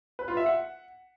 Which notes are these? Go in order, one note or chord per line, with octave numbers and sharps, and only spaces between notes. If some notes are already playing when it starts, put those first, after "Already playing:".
B4
F4
E5
F#5